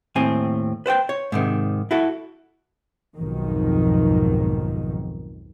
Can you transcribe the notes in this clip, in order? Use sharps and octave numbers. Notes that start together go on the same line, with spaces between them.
D#2 A2 C4 G#5
B4 C5 F#5 G5
C#5
G#2 C3 D#3
E4 F#4 A4
B1 F2 G#2 B2 D#3